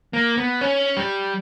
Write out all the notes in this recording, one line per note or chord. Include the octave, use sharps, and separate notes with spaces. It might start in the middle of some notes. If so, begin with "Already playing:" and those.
A#3
B3
C#4
G3